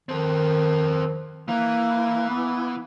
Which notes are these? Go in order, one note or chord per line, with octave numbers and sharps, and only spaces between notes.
D#3 C4 A4
E3 A#3
B3